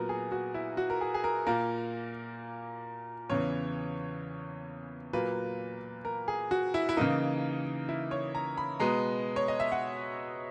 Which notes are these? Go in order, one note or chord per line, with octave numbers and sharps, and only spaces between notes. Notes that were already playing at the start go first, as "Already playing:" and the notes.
Already playing: A#2 F#3 B3 A#4
G#4
F#4
E4
F#4
A#4
G#4
G#4
A#4
A#2 A#3 A#4
E2 C#3 E3 C#5
A#2 F#3 A#3 B4
A#4
G#4
F#4
E4
E4
C#3 E3 A#3 D#4
E4
C#5
A#5
B5
B2 G#3 B3 A#5
C#5
D#5
E5
F#5